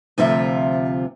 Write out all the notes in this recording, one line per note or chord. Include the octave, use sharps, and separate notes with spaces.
D2 C3 F3 F4 E5